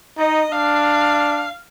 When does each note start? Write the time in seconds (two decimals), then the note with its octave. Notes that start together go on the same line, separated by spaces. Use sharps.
0.18 D#4 D#5
0.52 D4 F5